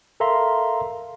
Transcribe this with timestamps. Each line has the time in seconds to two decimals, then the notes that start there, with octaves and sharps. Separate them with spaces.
0.20 A4 A#4 E5 F5 A#5 C6